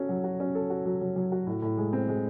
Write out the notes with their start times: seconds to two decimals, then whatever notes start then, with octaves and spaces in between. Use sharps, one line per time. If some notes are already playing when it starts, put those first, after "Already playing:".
Already playing: C#4 F#4 A4
0.09 F#3
0.24 F#4
0.40 C#4
0.55 A4
0.70 F#4
0.85 F#3
1.01 F#3
1.16 F#3
1.32 F#4
1.47 A2
1.62 A2
1.77 G#3
1.93 C4
2.08 G#3